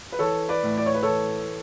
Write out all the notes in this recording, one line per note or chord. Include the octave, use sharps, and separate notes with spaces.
B4
E3 A4 C#5
B4 D5
A2
D5
C#5
B4
E3 A4 C#5